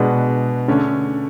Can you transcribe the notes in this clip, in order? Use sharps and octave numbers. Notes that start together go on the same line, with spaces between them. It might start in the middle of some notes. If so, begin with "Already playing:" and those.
Already playing: B2 G#3 D4 F#4 B4
D3 A3 C#4